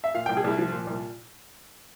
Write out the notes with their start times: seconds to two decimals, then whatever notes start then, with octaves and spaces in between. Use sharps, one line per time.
0.04 E5
0.14 A#2 F5
0.26 G5
0.29 C2
0.37 G#4
0.44 C2 E4
0.58 F3
0.72 A#2
0.87 C2